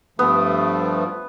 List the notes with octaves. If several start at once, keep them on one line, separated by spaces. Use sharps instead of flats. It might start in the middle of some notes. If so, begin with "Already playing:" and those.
G2 F3 A3 B3